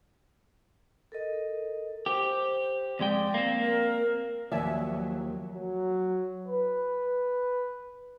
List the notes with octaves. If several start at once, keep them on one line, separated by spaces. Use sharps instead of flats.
A4 A#4 D#5
G4 C5
F2 G#3 D5 G5
A#3 C4
A#4
D#2 F3 F#3 D5 E5 G#5
F#3
B4